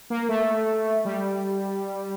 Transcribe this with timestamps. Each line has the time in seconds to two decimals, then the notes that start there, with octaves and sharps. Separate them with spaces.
0.10 A#3
0.29 A3
1.05 G3